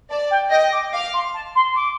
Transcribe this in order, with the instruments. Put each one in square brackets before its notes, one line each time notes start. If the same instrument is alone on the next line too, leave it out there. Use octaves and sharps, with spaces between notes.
[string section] D5 [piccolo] A5
[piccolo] G5
[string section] D#5 [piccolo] G5
[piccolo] D6
[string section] F5 [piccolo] D6
[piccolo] C6
A5
C6
D6